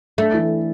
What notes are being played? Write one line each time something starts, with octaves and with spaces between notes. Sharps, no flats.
A3 D4
E3